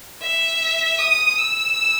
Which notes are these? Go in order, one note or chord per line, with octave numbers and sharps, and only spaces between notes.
E5
D#6
E6